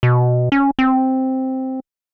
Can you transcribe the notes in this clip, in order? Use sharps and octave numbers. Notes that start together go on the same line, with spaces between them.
B2
C#4
C4